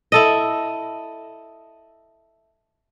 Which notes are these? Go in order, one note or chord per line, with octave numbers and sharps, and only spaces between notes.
E4 A4 D#5